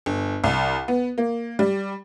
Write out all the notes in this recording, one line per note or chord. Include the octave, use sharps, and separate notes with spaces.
G1
C2
B3
A#3
G3